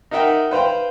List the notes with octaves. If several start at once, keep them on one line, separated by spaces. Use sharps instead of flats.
D#4 A#4 E5 F#5 G5
B4 C5 F5 G5